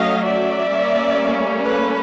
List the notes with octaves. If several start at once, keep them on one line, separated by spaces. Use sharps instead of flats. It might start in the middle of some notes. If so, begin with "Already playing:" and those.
Already playing: F#3 A3 C#4 D#5 F5
D5 E5
G3 A#3 C#4
A4 B4